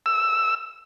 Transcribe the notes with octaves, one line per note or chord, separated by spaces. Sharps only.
E6